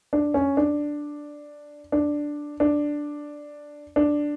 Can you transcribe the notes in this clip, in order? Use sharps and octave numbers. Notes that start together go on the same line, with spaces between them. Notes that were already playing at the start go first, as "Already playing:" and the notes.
D4
C#4
D4
D4
D4
D4